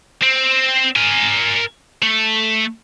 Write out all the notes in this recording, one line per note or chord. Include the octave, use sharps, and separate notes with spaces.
C4
A#4 G#5
A3